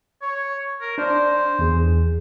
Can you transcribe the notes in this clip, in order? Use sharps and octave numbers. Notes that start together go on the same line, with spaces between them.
C#5
A#4
D4 C5 D5
E2 G#4